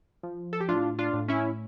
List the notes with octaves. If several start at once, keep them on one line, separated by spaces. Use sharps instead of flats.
F3
A4
G4
A2 D4 F4
D4 F4
A2
C#4 E4